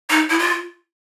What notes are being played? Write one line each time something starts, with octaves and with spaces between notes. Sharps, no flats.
D#4
E4
F4